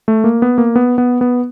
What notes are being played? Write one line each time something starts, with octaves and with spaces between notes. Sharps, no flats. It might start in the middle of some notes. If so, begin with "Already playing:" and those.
A3
A#3
B3
A#3
B3
B3
B3